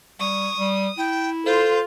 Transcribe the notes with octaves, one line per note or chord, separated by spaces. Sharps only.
G3 C#6 D#6
G3
E4 G5
F4 A4 C5